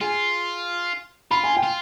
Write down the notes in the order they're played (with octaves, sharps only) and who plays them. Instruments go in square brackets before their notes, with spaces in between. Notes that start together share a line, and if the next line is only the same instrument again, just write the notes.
[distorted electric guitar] F4 [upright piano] G#4 G#5
[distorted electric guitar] F4 [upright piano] B5
[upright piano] G#5
G5
[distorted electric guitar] F4